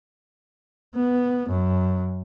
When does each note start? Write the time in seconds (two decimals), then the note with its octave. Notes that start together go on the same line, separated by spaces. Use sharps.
0.96 B3
1.51 F#2